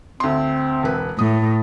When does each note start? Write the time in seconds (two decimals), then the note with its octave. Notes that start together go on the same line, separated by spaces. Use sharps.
0.20 D2 C4 C6
0.83 E1 B4
1.19 A2 D#6